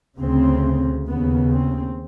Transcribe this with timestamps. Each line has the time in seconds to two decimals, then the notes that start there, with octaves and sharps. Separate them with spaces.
0.18 D2 C#3 C4
1.06 D#2 C#3 B3
1.52 C4